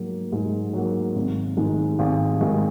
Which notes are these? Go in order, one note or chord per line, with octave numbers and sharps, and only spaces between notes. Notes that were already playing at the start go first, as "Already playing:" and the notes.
Already playing: G#2 F#3 A#3
G#2
F#3 A#3
G#1
G#2 D#3 G#3 D#4
G#1
G#2 D#3 G#3 D#4